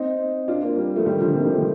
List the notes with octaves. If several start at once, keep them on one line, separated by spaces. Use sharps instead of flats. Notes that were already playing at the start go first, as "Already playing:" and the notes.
Already playing: C4 D#4
D4 F4
A#3 D4
G3 A#3
F3 A3
D#3 G3
D3 F3
C3 D#3
D#3 G3
F3 A3